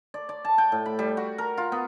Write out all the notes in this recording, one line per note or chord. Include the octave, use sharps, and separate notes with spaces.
D5
D5
A5
G5
A2
B5
G3
F#4
A#4
F4
B3